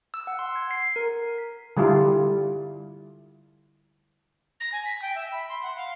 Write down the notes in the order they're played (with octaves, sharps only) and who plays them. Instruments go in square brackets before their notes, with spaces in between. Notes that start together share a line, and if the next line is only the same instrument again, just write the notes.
[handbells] E6
F#5
C6
G#6
C7
A#4
B6
[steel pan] D3 G3 E4 F4
[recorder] A#6
G#5
B6
G5
E5
B5
C6
F#5
F5